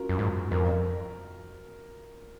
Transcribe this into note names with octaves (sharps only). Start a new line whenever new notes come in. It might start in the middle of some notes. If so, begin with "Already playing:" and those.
Already playing: C#4 F4 F#4 A#4
F#2
G#2
F2 A#4